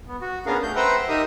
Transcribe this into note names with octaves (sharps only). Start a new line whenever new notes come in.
B3
F#4
B3 C#4 D4 G#4 A#4 F5
A3 G6
B4 C5 E5 F#5 G5 A#5
D#4 G4 A#4 E5 D#6